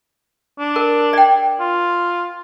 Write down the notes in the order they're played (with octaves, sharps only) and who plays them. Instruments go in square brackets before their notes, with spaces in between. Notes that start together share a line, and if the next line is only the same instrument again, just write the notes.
[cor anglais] D4
[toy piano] A#4
D5 G5
[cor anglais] F4